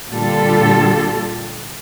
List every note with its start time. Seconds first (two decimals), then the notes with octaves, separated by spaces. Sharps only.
0.12 A#2 D3 G3 F4 G4 A4